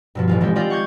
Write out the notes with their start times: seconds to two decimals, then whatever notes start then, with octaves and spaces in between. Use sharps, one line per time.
0.15 G2 B2 F3
0.28 D#1 A1 F4
0.41 E3 G#3 C4 G4
0.55 F4 G4 D5 D#5 F5 G5
0.70 F#5 C#6 D6 G6 G#6